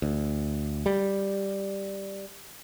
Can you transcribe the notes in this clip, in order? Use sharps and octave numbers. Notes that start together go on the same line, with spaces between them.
D2
G3